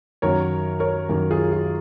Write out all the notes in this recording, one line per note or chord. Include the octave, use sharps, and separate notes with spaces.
F#2 D#3 F#3 A#3 A#4 C#5
A#4 C#5
F#2 D#3 F#3 A#3
F4 G#4
F4